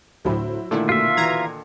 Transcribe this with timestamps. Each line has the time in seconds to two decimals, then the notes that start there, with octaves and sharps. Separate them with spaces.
0.25 D2 A2 F#3 E4 C5
0.71 A#2 D3 D#3 A3 E4
0.89 B2 A#3 F4 E5
1.17 E3 A#5 G#6